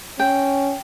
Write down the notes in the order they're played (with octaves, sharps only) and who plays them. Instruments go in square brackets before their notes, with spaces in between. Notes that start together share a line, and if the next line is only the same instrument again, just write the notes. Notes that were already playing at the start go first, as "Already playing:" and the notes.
[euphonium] C#4 [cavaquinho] G5